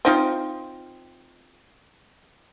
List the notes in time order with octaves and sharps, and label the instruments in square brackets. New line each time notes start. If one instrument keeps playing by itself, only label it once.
[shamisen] C4 D#4 F4